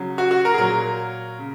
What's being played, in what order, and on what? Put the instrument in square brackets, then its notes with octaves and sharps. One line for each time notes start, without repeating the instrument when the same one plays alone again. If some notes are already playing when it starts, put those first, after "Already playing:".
Already playing: [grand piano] C#3 F#3
F#4
F#4
A#4
G#4
A#2 F#3 A#4
C#3